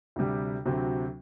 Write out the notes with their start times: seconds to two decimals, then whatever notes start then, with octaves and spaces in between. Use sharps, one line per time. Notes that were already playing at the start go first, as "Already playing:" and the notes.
0.16 D2 C3 G3
0.66 D2 C3 F#3 C4